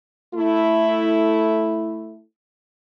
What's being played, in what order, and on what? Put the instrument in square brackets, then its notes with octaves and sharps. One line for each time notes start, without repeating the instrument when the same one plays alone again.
[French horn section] A3 E4